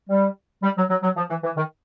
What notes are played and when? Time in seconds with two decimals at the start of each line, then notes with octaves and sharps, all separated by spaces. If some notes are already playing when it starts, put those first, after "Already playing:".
0.09 G3
0.63 G3
0.77 F#3
0.90 F#3
1.03 F#3
1.16 F3
1.29 E3
1.43 E3
1.57 D#3